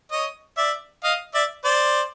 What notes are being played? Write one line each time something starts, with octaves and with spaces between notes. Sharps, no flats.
C#5 D#5
D5 E5
D#5 F5
D5 E5
C5 D5